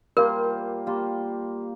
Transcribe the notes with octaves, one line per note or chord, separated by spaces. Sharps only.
G3 A#3 F4 A#4 C5
G3 A#3 F4 C5